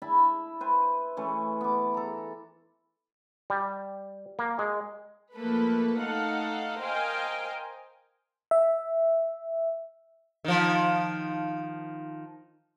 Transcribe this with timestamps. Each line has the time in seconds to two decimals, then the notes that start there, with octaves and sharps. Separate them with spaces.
0.02 E4 E5 A5 B5
0.60 B4 C5 G#5
1.17 E3 A3 C#4
1.61 B3 D6
1.94 A4 A#5
3.50 G3
4.39 A#3
4.59 G#3
5.36 F3 A3 A#3 A4 B4
6.00 A3 D#4 A4 F5 F#5
6.79 A#4 C5 D#5 F5 G5 G#5
8.51 E5
10.45 D#3 F3